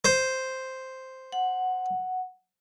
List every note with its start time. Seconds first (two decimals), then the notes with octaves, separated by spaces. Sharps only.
0.05 C5
1.32 F#5